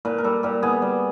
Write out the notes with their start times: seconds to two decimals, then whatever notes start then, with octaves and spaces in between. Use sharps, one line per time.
0.05 A#2 B4
0.18 A#4
0.24 G3 A4
0.43 A#2 G4
0.63 B3 G#4
0.82 G3